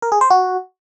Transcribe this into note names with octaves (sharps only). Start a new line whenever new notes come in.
A#4
G#4
C5
F#4